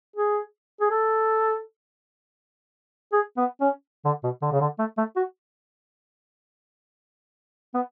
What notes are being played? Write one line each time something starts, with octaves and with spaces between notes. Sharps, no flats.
G#4
G#4
A4
G#4
B3
C#4
D3
B2
D3
C#3
D3
A3
A3
F#4
B3